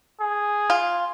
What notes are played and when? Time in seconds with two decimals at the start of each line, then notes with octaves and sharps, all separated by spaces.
0.20 G#4
0.70 F4